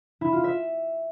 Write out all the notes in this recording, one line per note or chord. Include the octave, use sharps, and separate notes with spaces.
E4
F4
E5